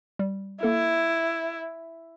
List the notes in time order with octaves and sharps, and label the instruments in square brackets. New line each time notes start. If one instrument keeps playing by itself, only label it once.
[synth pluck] G3
[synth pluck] A#3 A4 [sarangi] E4